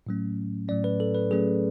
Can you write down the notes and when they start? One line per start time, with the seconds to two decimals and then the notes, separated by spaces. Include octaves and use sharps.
0.07 A2 F#3 A3 C#4
0.68 A2 F#3 A3 C#4 D5
0.84 B4
1.00 A4
1.15 B4
1.30 A2 F#3 A3 C#4 G#4